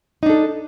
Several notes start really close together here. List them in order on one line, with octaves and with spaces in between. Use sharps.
D#4 D4 A4